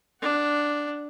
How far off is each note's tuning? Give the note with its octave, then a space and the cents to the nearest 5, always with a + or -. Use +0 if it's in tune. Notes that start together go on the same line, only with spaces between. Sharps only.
D4 +0 F#5 +10